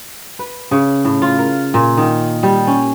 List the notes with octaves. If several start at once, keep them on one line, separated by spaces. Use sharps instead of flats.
B4
C#3
A2
F4
A#4
A#2
D#3
G3
C#4